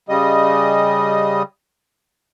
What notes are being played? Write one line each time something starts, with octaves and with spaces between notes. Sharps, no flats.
C#3 G3 D#5